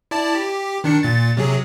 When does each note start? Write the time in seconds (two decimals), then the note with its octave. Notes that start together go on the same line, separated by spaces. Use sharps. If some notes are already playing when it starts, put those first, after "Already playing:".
0.11 E4 D5 A5
0.35 G4
0.84 D#3 D4 C#7
1.03 A#2 A6
1.37 C3 F#3 G#4